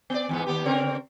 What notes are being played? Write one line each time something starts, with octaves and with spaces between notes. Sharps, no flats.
B3 D5
E2 G#2 B3
D#2 B3 G4
C#3 C4 A#4